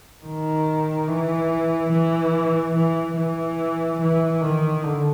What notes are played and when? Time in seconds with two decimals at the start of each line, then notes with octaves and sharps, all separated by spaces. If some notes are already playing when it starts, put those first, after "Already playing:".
0.24 D#3
1.08 E3
1.91 E3
2.75 E3
3.16 E3
4.00 E3
4.41 D#3
4.84 D3